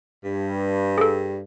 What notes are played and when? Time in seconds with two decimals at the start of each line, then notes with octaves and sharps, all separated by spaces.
0.25 G2
0.98 G#4 A4